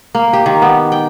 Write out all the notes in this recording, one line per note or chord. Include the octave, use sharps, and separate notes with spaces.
A#3
G4
D#3
B3
G5